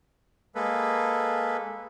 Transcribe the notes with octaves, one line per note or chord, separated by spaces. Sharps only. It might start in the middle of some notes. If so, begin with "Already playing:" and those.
G#3 A#3 A4 B4